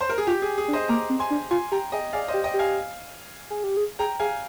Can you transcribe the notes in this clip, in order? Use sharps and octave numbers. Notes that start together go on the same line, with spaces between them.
C5
A#4
G#4
F4 G4
G#4
G#4
D4
C5 D#5
A#3 A#5 D6
C4
G#5 C6
D4
F4 G#5 C6
G4 G5 A#5
G#4 D#5 G5
G#4 D5 F5
C5 D#5
G4
D#5 G5
G4
F5 G#5
G#4
G4
G#4
G#4 G5 A#5
G#4 F5 G#5